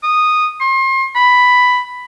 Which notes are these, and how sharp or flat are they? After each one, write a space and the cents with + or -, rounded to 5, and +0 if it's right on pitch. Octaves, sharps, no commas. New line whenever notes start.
D#6 -10
C6 +35
B5 +5